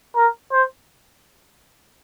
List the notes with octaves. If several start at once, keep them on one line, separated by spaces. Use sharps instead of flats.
A#4
C5